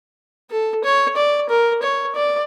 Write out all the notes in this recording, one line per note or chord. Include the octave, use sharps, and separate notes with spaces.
A4
C#5
D5
A#4
C#5
D5